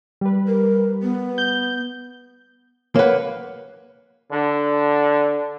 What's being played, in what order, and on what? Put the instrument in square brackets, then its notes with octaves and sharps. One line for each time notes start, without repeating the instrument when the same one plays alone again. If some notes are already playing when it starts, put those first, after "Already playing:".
[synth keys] G3 B4
[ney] A#4
B3
[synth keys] G6
[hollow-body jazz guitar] A#3 B4 [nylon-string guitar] C#5 F#5
[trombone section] D3